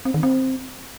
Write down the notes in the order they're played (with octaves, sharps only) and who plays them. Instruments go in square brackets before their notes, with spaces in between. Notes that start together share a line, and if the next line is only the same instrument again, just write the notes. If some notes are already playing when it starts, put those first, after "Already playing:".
[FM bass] C4
D#3
C4